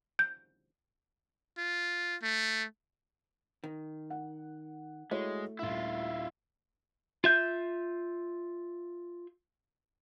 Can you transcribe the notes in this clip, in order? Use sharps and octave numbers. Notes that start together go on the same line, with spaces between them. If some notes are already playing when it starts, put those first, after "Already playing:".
G6
F4
A3
D#3
F#5
G#3 A3 E4 F#4 C#5
D#1 E4 F4 E5
F4 E5 G6